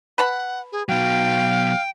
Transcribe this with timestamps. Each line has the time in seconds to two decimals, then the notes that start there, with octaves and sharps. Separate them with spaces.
0.18 B4 F#5 A5 B5
0.72 G#4
0.89 B2 F#3 F5 G5